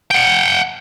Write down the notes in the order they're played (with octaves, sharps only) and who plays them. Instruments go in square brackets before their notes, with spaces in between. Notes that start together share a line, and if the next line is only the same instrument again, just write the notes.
[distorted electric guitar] F#5 G5